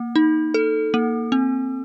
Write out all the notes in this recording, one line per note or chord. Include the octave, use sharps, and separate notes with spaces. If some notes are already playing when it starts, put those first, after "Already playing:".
Already playing: A#3
D#4
A4
A#3
C4